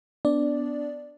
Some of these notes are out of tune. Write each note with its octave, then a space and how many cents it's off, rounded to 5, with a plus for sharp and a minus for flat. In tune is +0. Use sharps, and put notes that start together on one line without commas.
B3 +15 D4 -10 D5 +0